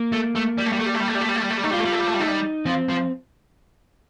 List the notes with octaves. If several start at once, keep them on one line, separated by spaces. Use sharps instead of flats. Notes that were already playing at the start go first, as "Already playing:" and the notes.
Already playing: A#3
A3
A3
G3
A3
G3
A3
G3
A3
G3
A3
G3
A3
G3
A3
G3
A3
G3
A3 D#4
G3 F4
A3
G3
A3
G3
A3
G3
A3 D#4
G3
F3 C4
F3